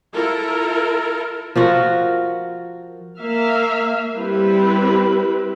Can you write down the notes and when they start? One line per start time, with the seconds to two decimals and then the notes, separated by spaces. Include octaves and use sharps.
0.13 E4 F4 A4 A#4
1.56 F3 F4 F#4 A#4
3.20 A#3 E5 F5
4.16 G3 C4 E4 G4 B4